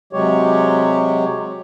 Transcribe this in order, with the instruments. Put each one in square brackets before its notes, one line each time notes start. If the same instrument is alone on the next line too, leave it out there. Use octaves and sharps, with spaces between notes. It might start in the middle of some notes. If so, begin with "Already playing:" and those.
[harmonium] C3 F#3 G#3 G4 C#5